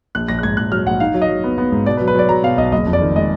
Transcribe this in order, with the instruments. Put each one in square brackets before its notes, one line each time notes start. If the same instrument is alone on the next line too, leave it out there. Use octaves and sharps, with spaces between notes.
[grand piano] A#1 F#6
A#1 A#6
F#6
G#2 G#6
A#1 F#6
F#3 F6
A#1 F#5
D#4 F5
F#3
D#5
F#3
B3
B3
G#2
B2 D5
B4
F#3
B4
F#3 D5
F#3 A#5
B2 F5
B1 D#5
F#1 D#5
F2
D5
D#3
G#3 D#5